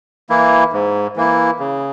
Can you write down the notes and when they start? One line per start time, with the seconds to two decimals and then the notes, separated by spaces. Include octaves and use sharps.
0.30 E3 A#3 E4
0.73 G#2
1.16 E3 A#3 E4
1.59 C#3